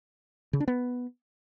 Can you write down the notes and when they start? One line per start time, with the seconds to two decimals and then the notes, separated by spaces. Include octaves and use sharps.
0.53 C#3
0.60 D4
0.68 B3